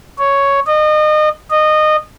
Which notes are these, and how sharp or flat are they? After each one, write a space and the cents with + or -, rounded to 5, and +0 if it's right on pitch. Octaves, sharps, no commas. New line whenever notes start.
C#5 +5
D#5 -30
D#5 -20